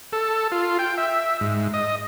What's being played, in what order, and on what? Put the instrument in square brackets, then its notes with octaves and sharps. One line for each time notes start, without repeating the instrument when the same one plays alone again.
[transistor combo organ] A4
F4
G5
E5
G#2
D#5